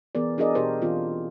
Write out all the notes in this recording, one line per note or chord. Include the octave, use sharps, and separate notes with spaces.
E3 B3 G#4 A#4 D5
D4 F#4 G#4 A#4 D5 D#5
B2 G4 A#4 C5
E3 C4 F4